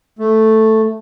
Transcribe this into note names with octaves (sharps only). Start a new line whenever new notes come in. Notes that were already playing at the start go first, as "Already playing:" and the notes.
A3